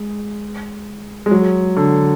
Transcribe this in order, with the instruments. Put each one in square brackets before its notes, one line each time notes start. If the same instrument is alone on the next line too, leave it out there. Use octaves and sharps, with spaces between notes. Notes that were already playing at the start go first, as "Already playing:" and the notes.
Already playing: [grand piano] G#3
G#3
F#3
D3